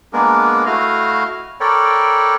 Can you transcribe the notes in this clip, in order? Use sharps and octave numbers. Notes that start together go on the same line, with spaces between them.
G#3 A#3 B3 D4 G#4 A#4
A3 E4 F#4 D#5 F5 F6
A4 A#4 C#5 D5 G5 B5